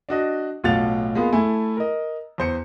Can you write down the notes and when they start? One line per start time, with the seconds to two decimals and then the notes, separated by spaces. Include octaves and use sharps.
0.09 D4 F#4 D#5
0.64 B1 A2 F4 F#5 A6 F7
1.15 G#3 A#3 B3 F4 G#4
1.33 A3 E4 G#5
1.77 A#4 D#5
2.38 E2 C5 C#7